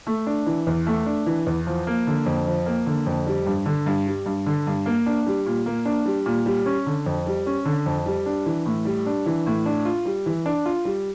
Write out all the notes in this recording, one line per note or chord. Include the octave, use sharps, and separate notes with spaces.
A3
D4
E3
E2
A3
D4
E3
E2
F3
A#3
D3
F2
F3
A#3
D3
F2
G3
G2
D3
G2
G3
G2
D3
G2
A#3
D4
G3
A#2
A#3
D4
G3
A#2
G3
C#4
D3
F2
G3
C#4
D3
F2
G3
D4
E3
A2
G3
D4
E3
A2
D4
F4
G3
E3
D4
F4
G3